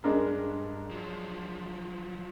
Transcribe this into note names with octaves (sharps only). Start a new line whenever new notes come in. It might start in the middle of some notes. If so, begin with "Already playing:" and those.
G2 G#3 D4 A#4
F3 F#3